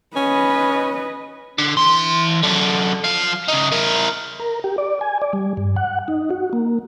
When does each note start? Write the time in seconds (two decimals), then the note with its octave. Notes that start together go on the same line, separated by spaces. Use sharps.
0.17 C#4 B4 D#5
1.59 D3
1.77 E3 C6
2.43 F#2 D3
3.04 F3 F5
3.48 C#3 D#4
3.72 E4 A#4
4.40 A#4
4.64 G4
4.78 D5
5.01 G#5
5.22 D5
5.33 G3
5.57 G2
5.76 F#5
6.08 D#4
6.31 F#4
6.53 A#3